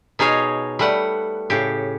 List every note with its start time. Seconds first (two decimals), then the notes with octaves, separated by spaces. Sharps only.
0.19 B2 D#4 G#4 C#5 F5
0.79 G3 A3 B4 F#5
1.50 A2 C#3 G4